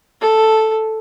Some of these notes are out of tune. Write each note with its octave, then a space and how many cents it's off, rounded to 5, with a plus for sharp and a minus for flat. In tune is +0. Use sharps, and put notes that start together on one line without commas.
A4 +0